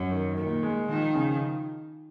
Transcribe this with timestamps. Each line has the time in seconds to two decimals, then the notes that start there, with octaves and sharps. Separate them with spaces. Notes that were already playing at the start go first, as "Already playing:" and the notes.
Already playing: F#2
0.11 D#3
0.37 A#2 D#3
0.63 G#3
0.89 D#3 F3
1.14 C#3